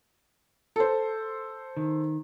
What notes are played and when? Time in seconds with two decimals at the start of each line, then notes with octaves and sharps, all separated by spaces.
0.76 A4 C5
1.77 D#3